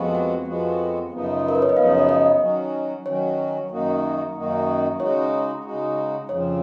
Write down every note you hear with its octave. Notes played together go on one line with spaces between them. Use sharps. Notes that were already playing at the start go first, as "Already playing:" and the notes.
Already playing: F2 F3 G#3 B3 F#4
F#5
F2 F3 G#3 B3 F#4
F#2 C#3 F3 B3 D#4
A#4
B4
C#5
D#5
F#2 C#3 F3 B3 D#4 F5
C#5
D#5
D#3 F#3 C#4 F#4
D#3 F#3 C#4 F#4 C#5
F#2 D#3 A#3 D#4 F#4
F#2 D#3 A#3 D#4 F#4
C#3 G#3 D#4 F#4 C#5
C#3 G#3 D#4 F#4
F2 C#3 F3 C#5